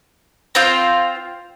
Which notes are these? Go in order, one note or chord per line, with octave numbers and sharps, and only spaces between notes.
C4 F4 C5 G5